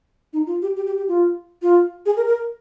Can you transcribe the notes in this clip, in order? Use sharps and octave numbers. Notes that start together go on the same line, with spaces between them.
D#4
F4
G4
G4
G4
G4
F4
F4
G#4
A#4
A#4